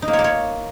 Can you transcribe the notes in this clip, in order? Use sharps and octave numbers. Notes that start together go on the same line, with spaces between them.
D#4
A#3
C#5
A#3
C#5